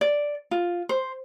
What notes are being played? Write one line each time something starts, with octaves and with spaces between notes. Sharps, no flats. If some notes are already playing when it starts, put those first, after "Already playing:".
D5
F4
C5